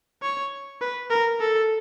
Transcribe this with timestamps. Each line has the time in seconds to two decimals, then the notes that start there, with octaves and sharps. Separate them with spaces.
0.22 C#5
0.81 B4
1.10 A#4
1.40 A4